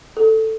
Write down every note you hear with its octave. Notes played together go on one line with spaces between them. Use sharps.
A4